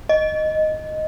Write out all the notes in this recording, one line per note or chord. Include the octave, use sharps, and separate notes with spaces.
D#5